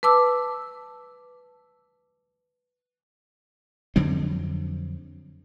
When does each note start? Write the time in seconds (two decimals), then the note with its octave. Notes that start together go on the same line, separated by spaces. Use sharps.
0.03 B4 A5 D6 E6
3.96 F2 D3 F#3 C4